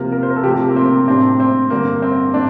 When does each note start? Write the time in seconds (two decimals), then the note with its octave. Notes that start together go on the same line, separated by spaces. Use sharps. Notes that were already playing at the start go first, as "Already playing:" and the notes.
Already playing: C3 F3 A#3 A#4
0.12 A#4
0.23 C5
0.30 A#4
0.36 A4
0.43 C3 F3 A3 G4
0.68 A#3
0.76 C4
1.07 A2 G3 C4 D4
1.40 C4
1.70 G2 D3 A3 A#3 D4
2.02 C4
2.34 A2 D4